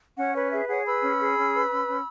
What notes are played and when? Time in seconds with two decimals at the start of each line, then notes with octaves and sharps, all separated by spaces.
0.18 C#4 C#5 F#5
0.35 B4 C#5
0.52 G#4 E5
0.68 G#4 C#5 F#5
0.85 B4 B5 E6
1.03 C#4
1.20 G#4
1.37 C#4
1.54 B4
1.71 C#4
1.87 C#4